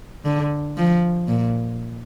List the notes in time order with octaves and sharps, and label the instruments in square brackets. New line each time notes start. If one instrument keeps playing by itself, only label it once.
[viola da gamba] D3
F3
A#2